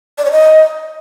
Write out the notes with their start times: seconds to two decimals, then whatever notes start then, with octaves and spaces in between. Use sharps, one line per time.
0.18 D5
0.25 C#5
0.32 D#5